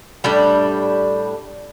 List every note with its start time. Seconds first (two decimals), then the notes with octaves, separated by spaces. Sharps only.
0.24 A2 G3 D4